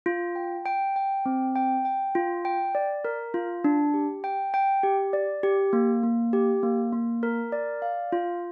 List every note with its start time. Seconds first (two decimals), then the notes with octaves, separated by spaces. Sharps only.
0.06 F4
0.36 G5
0.66 G5
0.96 G5
1.26 C4
1.56 G5
1.85 G5
2.15 F4
2.45 G5
2.75 D5
3.05 A#4
3.34 F4
3.64 D4
3.94 G4
4.24 G5
4.54 G5
4.83 G4
5.13 D5
5.43 G4
5.73 A#3
6.03 A#3
6.33 G4
6.63 A#3
6.93 A#3
7.23 A#4
7.52 D5
7.82 F5
8.12 F4